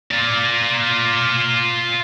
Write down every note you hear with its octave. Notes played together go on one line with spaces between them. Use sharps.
F4 D5